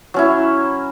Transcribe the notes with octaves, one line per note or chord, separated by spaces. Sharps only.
F#3 C#4 E4